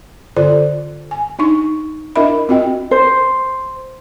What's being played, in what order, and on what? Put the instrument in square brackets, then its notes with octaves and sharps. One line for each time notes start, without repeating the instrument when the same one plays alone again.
[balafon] D3 F4 A4 C5 D5
G#5
D4 D#4 C#6
D4 E4 A#4 D#5 E5 B5
C4 F4 F#4 D#5 G5
[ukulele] C5